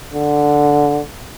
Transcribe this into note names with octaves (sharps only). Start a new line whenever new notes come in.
D3